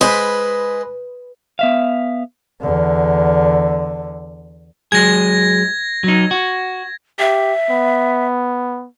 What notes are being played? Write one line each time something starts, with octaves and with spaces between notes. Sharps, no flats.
G#3 B4 C5 B5
B3 E5 F5
E2 D3
F#3 G#3 G#4 G#6 A#6
F#3 D#4
F#4
G4 E5
B3